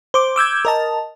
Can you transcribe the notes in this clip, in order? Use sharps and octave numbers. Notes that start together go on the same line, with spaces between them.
C5 D6
D6 E6 G6 G#6
A#4 D#5 A5